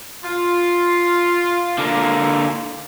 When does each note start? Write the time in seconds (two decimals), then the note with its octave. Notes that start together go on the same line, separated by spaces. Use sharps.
0.24 F4
1.78 D3 A#3